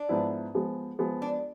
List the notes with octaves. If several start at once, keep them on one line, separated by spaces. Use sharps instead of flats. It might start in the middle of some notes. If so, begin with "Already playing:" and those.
Already playing: D4
G#2 F3 B3 E4 B4
F3 G#3 B3
F3 G#3 B3
D4